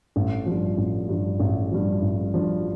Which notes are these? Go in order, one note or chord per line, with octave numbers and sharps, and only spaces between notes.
A1
G2 F3
A1
G2 F3
A1
G2 F3
A1
G2 F3